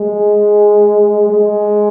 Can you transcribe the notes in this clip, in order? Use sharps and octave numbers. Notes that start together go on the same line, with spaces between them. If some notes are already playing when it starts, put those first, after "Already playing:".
Already playing: G#3
G#3